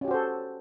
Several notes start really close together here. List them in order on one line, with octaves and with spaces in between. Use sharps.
C#4 G4 F#4 C5 A4